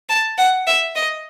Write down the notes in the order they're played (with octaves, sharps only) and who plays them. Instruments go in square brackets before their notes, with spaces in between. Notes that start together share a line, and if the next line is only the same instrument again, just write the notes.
[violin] A5
F#5
E5
D#5